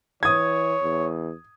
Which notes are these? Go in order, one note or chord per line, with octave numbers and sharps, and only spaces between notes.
E3 C#5 D#6 G#6
E2